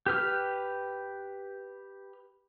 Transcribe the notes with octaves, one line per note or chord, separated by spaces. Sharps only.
G4 B4 F6